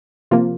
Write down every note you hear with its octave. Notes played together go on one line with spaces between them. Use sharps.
C3 F3 A#3 F4